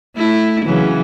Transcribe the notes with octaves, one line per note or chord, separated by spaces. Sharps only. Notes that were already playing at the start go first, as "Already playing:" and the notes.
A3 E4
C#3 E3 F#3